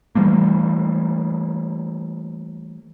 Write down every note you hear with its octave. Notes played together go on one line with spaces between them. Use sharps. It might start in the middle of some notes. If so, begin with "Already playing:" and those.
E3 G3 A3 A#3